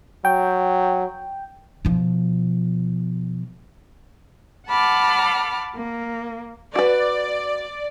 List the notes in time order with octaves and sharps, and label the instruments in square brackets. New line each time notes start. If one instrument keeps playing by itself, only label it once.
[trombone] F#3 [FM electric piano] G5
[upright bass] B2 F3
[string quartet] F#5 A5 B5 D6 F6
A#3
[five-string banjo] F#4 B4 [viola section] D5